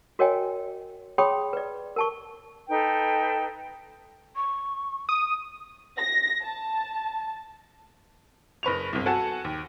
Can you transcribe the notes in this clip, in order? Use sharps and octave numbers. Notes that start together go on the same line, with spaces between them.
F#4 A#4 C#5 D#5 G5 G#5
G#4 C#5 G5 B5 C6 D#6
B4 D5
A#4 A5 C#6
D#4 A4 B4 G5
C#6
D#6
A#6
A5
F#1 B4 C#6 F7
G1 C2
F#4 A4 F#5 G#5 A5
D#2